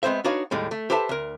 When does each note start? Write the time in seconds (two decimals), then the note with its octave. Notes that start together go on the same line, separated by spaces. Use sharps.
0.03 G#3 B3 C4 C5 E5
0.24 D4 D#4 F#4 B4 C#5 F5
0.51 D#2 A2 G3 G#3
0.71 A3
0.90 G4 A4 B4 C5 E5 A5
1.09 D2 A#4